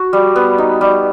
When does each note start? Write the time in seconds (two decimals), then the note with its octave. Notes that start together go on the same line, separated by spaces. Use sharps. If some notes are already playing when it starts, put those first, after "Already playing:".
Already playing: F#4
0.13 G3
0.36 B3
0.58 D#4
0.81 G3